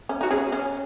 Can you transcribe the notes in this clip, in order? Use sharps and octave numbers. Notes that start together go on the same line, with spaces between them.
C#4
D#4 F#4
C#4 G#4
C#4